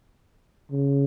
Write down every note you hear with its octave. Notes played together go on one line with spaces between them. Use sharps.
C#3